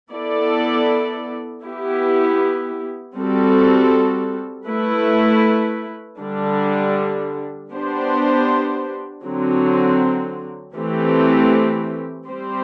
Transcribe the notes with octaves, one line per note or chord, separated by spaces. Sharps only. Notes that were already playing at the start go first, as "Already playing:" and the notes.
B3 E4 A4 D5
B3 E4 G4
G3 C4 F#4 A4
A3 E4 B4
D3 G3 D4
B3 D4 G4 C5
D3 F#3 C4
E3 A3 C4 G4
G3 C4 G4 C5